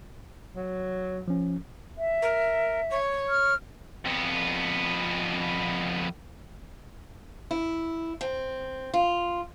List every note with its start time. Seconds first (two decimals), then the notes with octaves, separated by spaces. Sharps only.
0.56 F#3
1.28 F3 C#4
1.98 E5
2.21 A#4
2.90 C#5
3.29 F6
4.06 F2 B3
7.51 E4
8.21 C4
8.94 F4